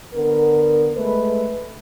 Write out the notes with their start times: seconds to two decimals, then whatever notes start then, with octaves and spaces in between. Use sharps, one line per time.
0.14 D3 B3 A#4
0.97 G#3 A3 B4